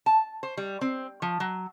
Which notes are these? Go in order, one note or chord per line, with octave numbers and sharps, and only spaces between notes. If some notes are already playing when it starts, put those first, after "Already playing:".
A5
C5
G3
C4
F3
F#3